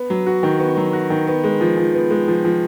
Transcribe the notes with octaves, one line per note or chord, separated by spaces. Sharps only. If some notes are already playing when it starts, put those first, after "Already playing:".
Already playing: B3
F#3
F#4
D#3
B3
F#3
F#4
D#3
B3
G#3
F3
F3
B3
G#3
F3
F3